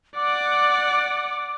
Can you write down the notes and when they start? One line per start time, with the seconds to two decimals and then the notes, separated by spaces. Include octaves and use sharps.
0.16 D5 F#5 D6